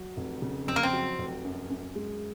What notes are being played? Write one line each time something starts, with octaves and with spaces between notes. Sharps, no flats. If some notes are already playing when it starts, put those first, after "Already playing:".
Already playing: F#3
F1
C#3
F2 C4
A#3
C4
F#3
F1
F#2
F#2
G#3